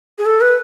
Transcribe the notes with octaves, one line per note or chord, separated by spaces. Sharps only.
G#4
A4
B4